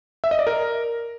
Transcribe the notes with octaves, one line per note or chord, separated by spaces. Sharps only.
E5
D#5
D5
A#4